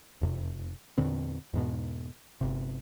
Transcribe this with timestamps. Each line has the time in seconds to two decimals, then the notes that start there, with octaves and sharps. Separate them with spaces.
0.21 E1 F2 C3
0.98 E2 A#2 D3 C4
1.54 E2 G#2 B2
2.41 G1 C3